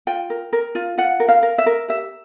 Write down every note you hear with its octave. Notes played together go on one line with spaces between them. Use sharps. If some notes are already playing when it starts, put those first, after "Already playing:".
F4 G5
A#4
A#4
F4
F4 F#5
A#4
F5
A#4
E5
A#4
G4 E5